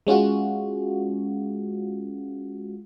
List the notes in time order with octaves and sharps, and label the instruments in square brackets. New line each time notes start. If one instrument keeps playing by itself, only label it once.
[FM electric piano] G#3 C#4 F4 F#4